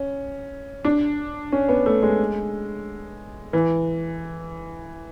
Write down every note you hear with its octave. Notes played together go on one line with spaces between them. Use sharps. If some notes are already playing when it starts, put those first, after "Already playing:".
Already playing: C#4
D4
C#4
B3
A3
G#3
E3